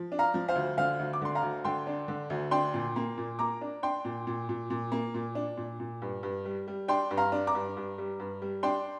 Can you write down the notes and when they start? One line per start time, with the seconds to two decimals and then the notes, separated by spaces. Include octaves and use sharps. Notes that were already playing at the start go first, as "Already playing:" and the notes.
Already playing: F3
0.12 D4
0.19 F5 A#5
0.34 F3
0.48 C5 F5
0.55 D2
0.77 D3 C5 F5
0.99 D2
1.13 D6
1.21 D3 C6
1.35 F5 A#5
1.43 D2
1.64 D3 G5 C6
1.87 D4
2.08 D3
2.30 D2
2.51 D4 G5 C6
2.74 A#2
2.96 A#3
3.18 A#2
3.39 A#3 A#5 D6
3.61 D4
3.83 D4 G5 C6
4.05 A#2
4.27 A#2
4.49 A#2
4.70 A#2
4.92 A#3
5.14 A#2
5.35 D4
5.57 A#2
5.80 A#2
6.02 G2
6.23 G2
6.45 G3
6.68 G3
6.88 D4 G5 C6
7.11 G2
7.17 F5 A#5
7.32 D4
7.47 A#5 D6
7.55 G2
7.77 G2
7.98 G3
8.20 G2
8.42 G3
8.63 D4 G5 C6